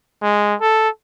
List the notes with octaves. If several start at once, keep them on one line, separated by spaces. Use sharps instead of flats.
G#3
A4